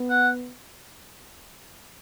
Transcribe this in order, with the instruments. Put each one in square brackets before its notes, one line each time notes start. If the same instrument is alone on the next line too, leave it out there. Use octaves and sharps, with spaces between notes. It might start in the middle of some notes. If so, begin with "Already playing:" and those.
Already playing: [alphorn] B3
[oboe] F#5